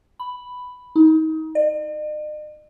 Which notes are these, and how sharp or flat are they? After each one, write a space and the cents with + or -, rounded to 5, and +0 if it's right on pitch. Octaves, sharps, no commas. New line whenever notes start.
B5 +5
D#4 +30
D#5 -45